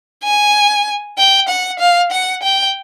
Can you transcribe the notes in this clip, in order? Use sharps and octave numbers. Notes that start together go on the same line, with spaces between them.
G#5
G5
F#5
F5
F#5
G5